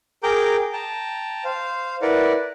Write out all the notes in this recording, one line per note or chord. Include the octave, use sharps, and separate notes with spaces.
G#4 A#4 G5 A#5 D6 G6
G5 A5 A#5
C5 F5
E4 A#4 B4 D5 F#5